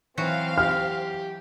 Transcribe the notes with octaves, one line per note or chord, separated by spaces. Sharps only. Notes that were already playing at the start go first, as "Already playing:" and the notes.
E3 F#3 C4 F#4 F5
G4 F6